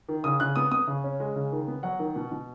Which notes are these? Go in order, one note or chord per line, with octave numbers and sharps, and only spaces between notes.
D#3
C#3 D#6
C#3 F#6
B3 D#6
B3 D#6
C#3
C#4
G#3
C#3
D#3
B3
F#3 F#5
D#3
B2
B2